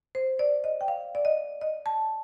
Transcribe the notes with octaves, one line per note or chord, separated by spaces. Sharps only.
C5
D5
D#5
G5
F5
D5
D#5
D#5
A5